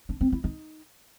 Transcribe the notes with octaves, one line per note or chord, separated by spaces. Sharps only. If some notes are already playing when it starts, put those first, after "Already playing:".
D4
C4
E4
D#4